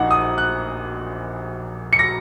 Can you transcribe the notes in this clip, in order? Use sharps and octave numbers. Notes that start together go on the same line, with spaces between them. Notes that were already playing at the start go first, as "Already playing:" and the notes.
Already playing: A#1 A#2 A#3 D#4 F#5
D#6
F#6
C#7
A#6